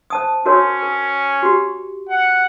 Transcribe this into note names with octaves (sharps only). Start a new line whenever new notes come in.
C5 A5 D#6
C#4 F#4 A#4 C#5
A#4
F#4 G4
F#5